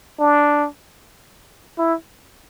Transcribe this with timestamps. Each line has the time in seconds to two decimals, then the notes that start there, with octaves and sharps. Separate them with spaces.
0.19 D4
1.78 E4